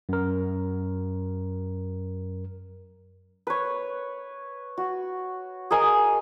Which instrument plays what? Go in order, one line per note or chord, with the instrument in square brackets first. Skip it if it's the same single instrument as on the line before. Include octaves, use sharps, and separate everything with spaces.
[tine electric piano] F#2 A#4
[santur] B4 C#5
F#4
G#4 A#4 D#5 G#5